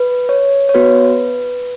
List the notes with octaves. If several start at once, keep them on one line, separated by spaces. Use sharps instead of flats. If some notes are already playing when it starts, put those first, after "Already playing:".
Already playing: B4
C#5
C#5
B3 F#4 B4